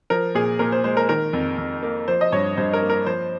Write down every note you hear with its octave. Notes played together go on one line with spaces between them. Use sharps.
F3 A#4
A#2 G#4
A#2 A#4
C5
G#3 C5
A#4
D#3 A#4
F2
F2
A#3
F3 C5
D#5
G2 C#5
G2 C5
A#4
A#3
A#4
F3 C5